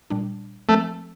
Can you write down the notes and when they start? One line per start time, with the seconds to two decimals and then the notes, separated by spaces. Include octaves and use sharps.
0.10 A#2 G3 D4
0.69 F3 A3 C4